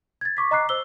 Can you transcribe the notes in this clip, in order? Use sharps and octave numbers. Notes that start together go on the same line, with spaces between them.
G#6 A6
C#6 D6 B6
D#5 A#5 D6 F#6 C7
C5 E6 G7